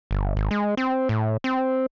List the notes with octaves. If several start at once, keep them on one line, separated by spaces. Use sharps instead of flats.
G1
G#1
G#3
C4
A2
C4